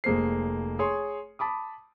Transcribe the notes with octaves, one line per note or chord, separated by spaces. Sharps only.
F1 G#3 A#3 C5 C7
G#4 C#5 C6
A5 B5 D6 D#6